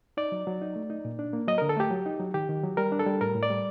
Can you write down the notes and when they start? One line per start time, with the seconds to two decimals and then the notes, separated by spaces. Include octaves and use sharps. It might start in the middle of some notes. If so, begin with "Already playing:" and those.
0.17 D#4 D5
0.32 F#3
0.47 F#3
0.62 D#4
0.76 A3
0.90 D#4
1.05 A#2
1.19 D4
1.33 A#3
1.47 F#3 D#5
1.58 D3 A#4
1.69 A4
1.76 A3 G4
1.91 F#3
2.06 D#4
2.19 F#3
2.34 D#3 G4
2.49 D#3
2.64 F#3
2.77 G3 A#4
2.92 D4
3.00 A4
3.06 G3
3.21 A2 A#4
3.35 A2
3.43 D5
3.50 G3